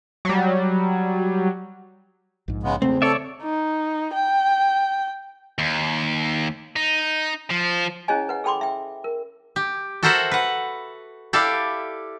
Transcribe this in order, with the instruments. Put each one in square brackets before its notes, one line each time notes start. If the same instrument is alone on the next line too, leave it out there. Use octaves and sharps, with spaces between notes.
[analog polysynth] F#3 G3
[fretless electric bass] A#1 G#2
[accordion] C#3 G#3 B3
[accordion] E2 [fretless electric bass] C#3 A3 [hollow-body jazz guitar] C4
[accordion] A4 [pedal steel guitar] C#5 D5 E5
[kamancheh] D#4
G5
[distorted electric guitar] D#2
D#4
F3
[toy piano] C#4 E4 G#4 C#5 D#5 G#5
B4 F#5
G#4 A4 G5 B5 C6 D6
E5 G5
A#4
[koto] G4
F#4 A4 A#4 C5 E5 F#5
B4 F#5
E4 G4 A4 D5 F5